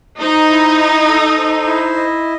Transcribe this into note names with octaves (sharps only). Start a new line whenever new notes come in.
D#4 C5
E4
D#5
A4
C5
E4
D#5